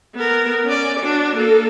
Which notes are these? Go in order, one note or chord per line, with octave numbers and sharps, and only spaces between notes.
B3 A#4
C#4 D5
D4 F#4
A#3 A4